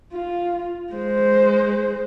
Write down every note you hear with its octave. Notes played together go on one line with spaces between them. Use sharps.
F4
G#3 C5